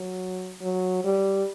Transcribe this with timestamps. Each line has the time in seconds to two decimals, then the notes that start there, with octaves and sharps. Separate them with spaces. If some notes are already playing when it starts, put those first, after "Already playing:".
Already playing: F#3
0.61 F#3
1.04 G3